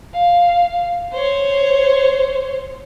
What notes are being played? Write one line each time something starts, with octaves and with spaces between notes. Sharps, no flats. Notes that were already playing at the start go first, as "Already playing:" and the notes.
F5
C5 C#5